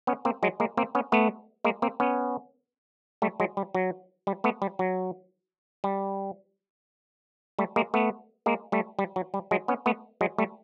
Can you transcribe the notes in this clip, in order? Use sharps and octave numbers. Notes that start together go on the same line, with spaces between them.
B3 C#4
A#3 C4
F#3 G#3
G#3 A#3
A#3 C4
B3 C#4
A3 B3
G#3 A#3
A#3 C4
B3 C#4
G3 A3
F#3 G#3
G3
F#3
G3
A3 B3
G3
F#3
G3
G3 A3
G#3 A#3
A3 B3
G#3 A#3
G3 A3
G3
F#3
G3
F#3 G#3
B3 C#4
A3 B3
F#3 G#3
G3 A3